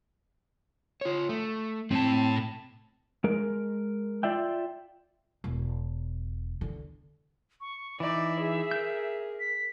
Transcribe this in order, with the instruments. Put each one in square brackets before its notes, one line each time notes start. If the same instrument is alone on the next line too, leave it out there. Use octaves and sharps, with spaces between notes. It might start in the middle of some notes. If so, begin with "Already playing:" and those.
[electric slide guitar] F4 C#5
A3
[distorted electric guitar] A2 A5 [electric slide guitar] C4
[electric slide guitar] G#3 A#4
F4 D5 E5 G5
[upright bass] E1
D3
[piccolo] C#6
[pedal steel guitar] E3 D#4 [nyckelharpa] D5 [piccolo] E5
[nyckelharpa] G#4
[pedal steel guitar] A#4 G6
[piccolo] B6